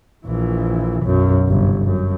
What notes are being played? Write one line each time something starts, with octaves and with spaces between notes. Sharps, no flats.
A#1 E3
B1 F#2
G1 C2
F#2